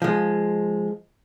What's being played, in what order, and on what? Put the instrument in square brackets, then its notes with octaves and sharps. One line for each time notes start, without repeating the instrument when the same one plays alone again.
[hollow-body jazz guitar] F3 G#3